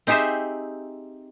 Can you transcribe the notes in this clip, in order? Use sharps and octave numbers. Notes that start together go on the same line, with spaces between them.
C4 D#4 G4 G#4 C5 E5